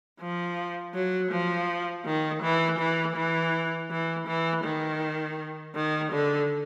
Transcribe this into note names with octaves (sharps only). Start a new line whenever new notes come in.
F3
F#3
F3
D#3
E3
E3
E3
E3
E3
D#3
D#3
D3